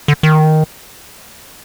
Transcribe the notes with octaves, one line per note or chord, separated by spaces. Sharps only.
D3
D#3